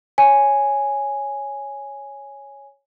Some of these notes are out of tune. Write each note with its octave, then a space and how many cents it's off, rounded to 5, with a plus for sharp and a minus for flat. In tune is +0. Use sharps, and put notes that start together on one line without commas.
C#5 +0 G#5 +0